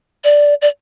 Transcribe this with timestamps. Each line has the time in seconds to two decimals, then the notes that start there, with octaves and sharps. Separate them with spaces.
0.24 D5
0.62 D5